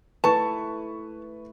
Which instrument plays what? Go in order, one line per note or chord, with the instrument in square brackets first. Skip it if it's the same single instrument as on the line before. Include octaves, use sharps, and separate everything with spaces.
[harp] A3 E4 [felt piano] B4 C#6 [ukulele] A5